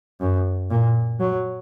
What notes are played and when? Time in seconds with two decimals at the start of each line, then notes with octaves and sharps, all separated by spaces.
0.21 F#2
0.71 A#2
1.20 F#3